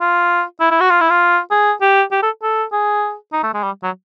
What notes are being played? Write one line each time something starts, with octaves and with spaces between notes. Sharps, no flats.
F4
E4
E4
F#4
F4
E4
F4
G#4
G4
G4
A4
A4
G#4
D#4
A3
G#3
G3
F#3